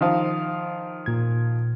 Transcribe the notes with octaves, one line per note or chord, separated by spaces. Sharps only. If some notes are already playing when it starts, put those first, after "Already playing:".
D#3 F3 F5
A#2 G#6